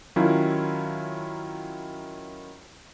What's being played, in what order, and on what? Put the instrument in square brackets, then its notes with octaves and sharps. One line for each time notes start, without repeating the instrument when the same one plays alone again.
[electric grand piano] D#3 F#3 C#4 E4 F4